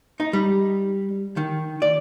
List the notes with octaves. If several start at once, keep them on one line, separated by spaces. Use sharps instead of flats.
D#4
G3
D#3
D5